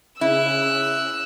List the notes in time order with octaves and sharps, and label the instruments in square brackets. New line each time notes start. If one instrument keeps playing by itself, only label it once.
[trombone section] C#3 [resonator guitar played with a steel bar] E4 [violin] E6 F#6